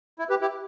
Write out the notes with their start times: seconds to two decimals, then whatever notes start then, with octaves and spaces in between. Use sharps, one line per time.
0.19 E4
0.30 G4 B4
0.41 E4 G4